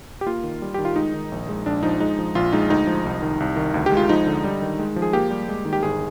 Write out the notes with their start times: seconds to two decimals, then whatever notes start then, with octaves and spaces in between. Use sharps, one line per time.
0.21 G4
0.26 A#3 F4
0.44 D#3
0.62 G3
0.74 D#3 G4
0.85 F4
0.96 G#3 D#4
1.14 D#3
1.32 A#1
1.49 G#3
1.66 A#1 D4
1.83 F3 D#4
2.00 G#3 D#4
2.19 F3
2.35 A#1 F4
2.53 G#3 D#4
2.70 D2 D#4
2.87 F3
3.05 C2
3.22 D#3
3.40 C2
3.57 D#3
3.74 D2
3.86 G4
3.92 G#3 F4
4.09 F3 D#4
4.26 D3
4.44 G3
4.62 D#3
4.79 G#3
4.96 F3
5.02 G#4
5.13 A#3 G4
5.30 G3
5.49 G#3
5.65 D#3
5.73 G4
5.83 G1 G#4